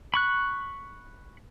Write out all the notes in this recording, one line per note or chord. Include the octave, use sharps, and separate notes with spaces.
B5 C#6 F#6